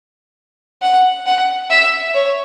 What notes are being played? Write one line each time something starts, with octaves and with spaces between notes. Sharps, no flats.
F#5
F#5
E5
C#5